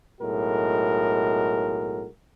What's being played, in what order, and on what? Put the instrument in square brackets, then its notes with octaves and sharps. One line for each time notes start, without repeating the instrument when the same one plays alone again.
[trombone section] B1 A2 G#3 F#4 A#4